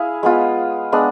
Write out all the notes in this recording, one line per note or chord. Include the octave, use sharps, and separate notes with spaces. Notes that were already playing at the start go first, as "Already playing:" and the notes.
Already playing: E4 G#4 F5
G#3 B3 F4
G#3 B3 D4